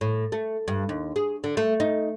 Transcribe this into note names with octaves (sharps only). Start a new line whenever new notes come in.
A2
A3
G2
D#2
G#4
D3
A3
D#4